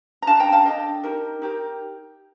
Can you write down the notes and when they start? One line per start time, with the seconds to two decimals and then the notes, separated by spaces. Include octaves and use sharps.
0.22 A#5
0.27 D4 A4 F5 A5
0.40 G5 A#5
0.52 F5 A5
0.65 D4 A4 D#5 G5
1.04 D#4 G4 A#4
1.42 D#4 G4 A#4